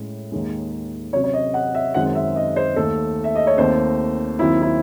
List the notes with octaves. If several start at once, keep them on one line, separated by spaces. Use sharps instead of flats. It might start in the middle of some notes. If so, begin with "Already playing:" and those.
Already playing: A2 G#3 C#4
D#2 D#3 G#3
C3 F#3 C#4 C#5
C#5
D#5
F#5
E5
F#2 D#3 G#3 C4 F#5
E5
D#5
C5
D#2 D#3 A3 A4
E5
D#5
C#5
D#2 D#3 A3 C4 C5
D#2 D#3 F#3 C4 E4
E4